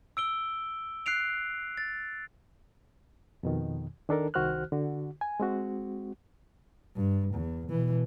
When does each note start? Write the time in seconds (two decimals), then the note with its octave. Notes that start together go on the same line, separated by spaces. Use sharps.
0.17 E6 D7 G7
1.06 F#6 C7 D7 F7
1.77 A6
3.43 F2 B2 D#3
4.09 D#3 D4 A4 A#4
4.34 C2 D#3 F#4 C5 F6 F#6
4.72 D3 F#4
5.21 G#5
5.40 G#3 C4 F#4
6.96 G2
7.35 E2
7.70 B2 E3